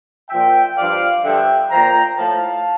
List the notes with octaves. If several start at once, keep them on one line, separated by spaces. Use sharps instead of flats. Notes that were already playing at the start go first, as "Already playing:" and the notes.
A#2 F3 E5 G5
G2 F3 D5 F5
G2 D3 F3 E5 G5
A#2 F3 G5 A#5
A2 F3 F5 A5